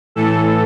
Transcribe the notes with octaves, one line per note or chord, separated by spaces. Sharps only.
A2 E3 A4